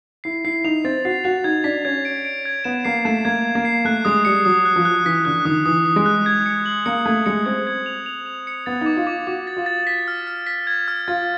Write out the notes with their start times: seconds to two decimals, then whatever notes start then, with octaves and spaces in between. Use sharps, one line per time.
0.24 E4 C7
0.45 E4 C7
0.64 D#4 F7
0.85 C4 A6
1.05 F#4 C7
1.24 F#4 F7
1.44 D#4 G#6
1.64 D4 B6
1.85 C#4 G#6
2.05 D7
2.25 D7
2.45 G#6
2.64 B3 E7
2.85 A#3 C7
3.05 A3 E7
3.25 A#3 G#6
3.45 G#6
3.55 A#3
3.65 C7
3.85 A3 F#6
4.05 G#3 D#6
4.25 G3 C#7
4.45 F#3 D#6
4.65 F#6
4.76 F3
4.85 F#6
5.06 E3 B6
5.25 D3 F#6
5.45 D#3 D#6
5.66 E3 D#6
5.86 D#6
5.96 G#3
6.06 F#6
6.26 G#6
6.46 C#7
6.66 F#7
6.86 A#3 C#7
7.06 A3 G#6
7.26 G#3 C#7
7.46 C4 G#6
7.67 G#6
7.86 F7
8.06 F7
8.26 F7
8.47 C#7
8.66 B3 A6
8.81 D#4 D6
8.97 F4
9.07 D6
9.27 F#4 D6
9.47 A6
9.57 F4
9.66 A6
9.87 B6
10.08 F6
10.27 F6
10.47 B6
10.67 G#6
10.88 F6
11.08 F4 A6